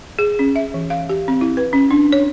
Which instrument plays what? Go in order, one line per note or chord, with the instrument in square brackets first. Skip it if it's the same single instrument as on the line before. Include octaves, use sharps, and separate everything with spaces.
[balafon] G#4
C#4
E5
E3
F5
G4
C4
E4
B4
C#4
D4
C#5